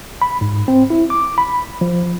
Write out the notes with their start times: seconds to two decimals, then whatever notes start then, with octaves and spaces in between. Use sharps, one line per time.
0.22 B5
0.41 G#2
0.68 C4
0.90 E4
1.10 D6
1.38 B5
1.81 F3